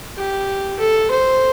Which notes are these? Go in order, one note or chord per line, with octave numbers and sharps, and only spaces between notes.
G4
A4
C5